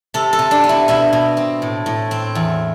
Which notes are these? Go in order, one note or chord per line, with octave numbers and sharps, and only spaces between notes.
C3 A4
A4
C3
D4
B3
E4
B2 E4
B2
C4
A2
A2
C4
E2